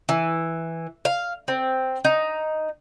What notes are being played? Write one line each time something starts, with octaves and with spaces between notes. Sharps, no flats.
E3
F5
C4
D#4